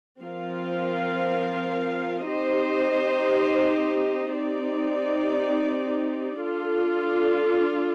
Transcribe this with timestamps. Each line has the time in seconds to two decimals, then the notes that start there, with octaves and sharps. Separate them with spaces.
0.22 F3 C4 F4 A#4 F5
2.28 C4 D#4 G4 C5 D#5
4.33 C4 D#4 G4 D5
6.39 D4 F4 A4